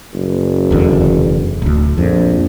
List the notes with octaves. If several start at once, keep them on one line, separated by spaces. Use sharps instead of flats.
F#1
F1 E2 D3
D1 D2
A#1 F2